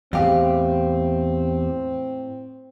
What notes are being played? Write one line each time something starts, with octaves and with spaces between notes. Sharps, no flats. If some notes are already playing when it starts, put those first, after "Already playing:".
E2 A2 C4 G4 G#4 F5